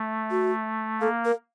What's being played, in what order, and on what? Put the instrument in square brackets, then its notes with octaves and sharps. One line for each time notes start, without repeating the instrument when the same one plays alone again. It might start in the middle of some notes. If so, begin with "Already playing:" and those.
Already playing: [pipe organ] A3
[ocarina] F#4
[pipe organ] A#3 [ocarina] A4
[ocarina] A#4